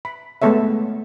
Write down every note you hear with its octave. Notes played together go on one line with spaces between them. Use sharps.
B5
G#3 A3 B3 A4 C#5 E5